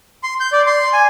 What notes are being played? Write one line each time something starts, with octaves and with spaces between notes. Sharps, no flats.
C6
G6
D5
C6
G#5